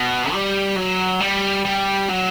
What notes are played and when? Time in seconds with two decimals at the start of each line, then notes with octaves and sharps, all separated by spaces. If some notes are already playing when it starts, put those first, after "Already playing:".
Already playing: B2
0.32 G3
0.76 F#3
1.20 G3
1.65 G3
2.09 F#3